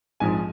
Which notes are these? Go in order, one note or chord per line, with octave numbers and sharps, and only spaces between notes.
A#1 G#2 F3 G#5